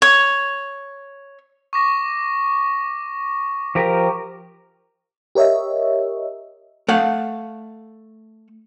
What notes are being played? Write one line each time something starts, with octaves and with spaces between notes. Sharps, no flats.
C#5
C#6 D6 A#6
F3 G4 A#4
G4 A#4 C#5 D#5 E5
A3 F5 F#5